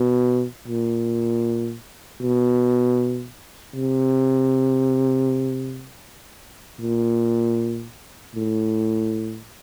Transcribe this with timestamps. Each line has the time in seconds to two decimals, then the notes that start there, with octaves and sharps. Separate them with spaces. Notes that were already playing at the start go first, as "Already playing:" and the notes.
Already playing: B2
0.68 A#2
2.21 B2
3.75 C3
6.81 A#2
8.35 A2